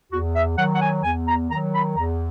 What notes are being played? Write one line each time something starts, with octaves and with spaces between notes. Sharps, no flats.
E2 F#4
E5
D#3 F#3 F#5
F#5
G#5
E2 G#5
A#5
D#3 F#3 A#5
B5
E2 A#5